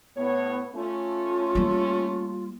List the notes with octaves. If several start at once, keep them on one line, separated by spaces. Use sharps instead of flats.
A2 B3 C#5
A3 C#4 F4
G3 A#3